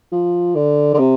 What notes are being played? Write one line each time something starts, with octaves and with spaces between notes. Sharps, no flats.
F3
D3
D3
C3